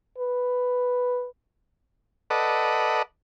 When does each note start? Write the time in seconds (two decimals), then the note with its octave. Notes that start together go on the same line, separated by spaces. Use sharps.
0.18 B4
2.30 A4 B4 D5 D#5 F#5